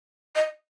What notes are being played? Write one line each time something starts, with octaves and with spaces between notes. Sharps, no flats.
D#5